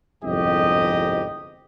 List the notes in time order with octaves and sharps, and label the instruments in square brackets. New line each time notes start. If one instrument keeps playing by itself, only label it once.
[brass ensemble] G1 C2 F2 G#2 G4 D#5